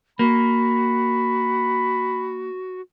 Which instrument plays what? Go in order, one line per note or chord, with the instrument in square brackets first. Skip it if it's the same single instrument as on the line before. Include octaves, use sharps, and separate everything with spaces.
[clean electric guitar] A#3 [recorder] F#4 [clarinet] B5